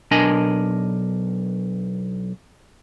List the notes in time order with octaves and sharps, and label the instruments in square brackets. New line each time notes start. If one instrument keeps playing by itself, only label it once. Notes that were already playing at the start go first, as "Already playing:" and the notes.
[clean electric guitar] B1 D4 A#4 D#5 G#5